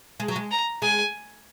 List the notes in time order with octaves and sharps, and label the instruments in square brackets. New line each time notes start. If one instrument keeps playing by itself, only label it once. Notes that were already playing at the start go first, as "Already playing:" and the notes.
[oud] G#3
F#3
G#3
[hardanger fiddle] A#5
[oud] G#3 [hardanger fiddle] G#5